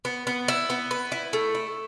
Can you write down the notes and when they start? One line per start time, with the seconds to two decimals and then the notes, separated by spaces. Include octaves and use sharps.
0.05 B3
0.27 B3
0.48 E4
0.70 B3
0.91 B4
1.12 E4
1.33 A3
1.55 E4